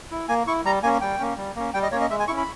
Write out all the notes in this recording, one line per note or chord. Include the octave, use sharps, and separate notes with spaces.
E4
A#3 G#5
E4 C#6
G3 A#5
A#3 C#4 G#5
G3 G5
A#3 C#4
G3
A#3 C#4
G3 G5
D#5
A#3 C#4 C#5
D#5
G#3 E5
G#5
C#4 E4 C#6
B5